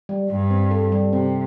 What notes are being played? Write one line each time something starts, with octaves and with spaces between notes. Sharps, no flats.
G3
G2 G3
C4
A4
G3
C3 C4